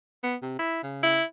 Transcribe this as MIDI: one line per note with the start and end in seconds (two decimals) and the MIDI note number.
0.24 0.36 59
0.42 0.55 48
0.59 0.80 64
0.83 1.18 49
1.03 1.24 64